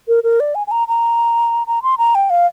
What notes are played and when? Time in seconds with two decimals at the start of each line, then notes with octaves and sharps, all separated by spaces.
0.08 A#4
0.24 A#4
0.40 D5
0.55 G#5
0.67 G#5
0.71 A#5
0.88 A#5
1.67 A#5
1.83 C6
1.98 A#5
2.15 G5
2.30 F5